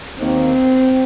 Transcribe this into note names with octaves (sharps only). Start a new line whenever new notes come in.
D#2 D#3 A#3 C4